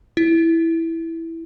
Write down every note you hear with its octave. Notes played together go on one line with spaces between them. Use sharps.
E4